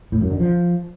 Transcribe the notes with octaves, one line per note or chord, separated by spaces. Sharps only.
A2
F#2
D3
F3